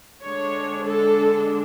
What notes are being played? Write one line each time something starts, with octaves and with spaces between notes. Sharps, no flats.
D3 G#3 D4 C#5
A4